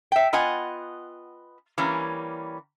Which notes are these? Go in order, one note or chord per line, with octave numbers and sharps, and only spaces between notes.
E5 G5
B3 F4 D#5 F#5 G#5
E3 G3 A#3 C#4